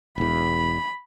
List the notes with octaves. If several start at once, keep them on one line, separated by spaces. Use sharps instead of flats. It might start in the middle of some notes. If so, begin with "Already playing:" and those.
E1 E2 B5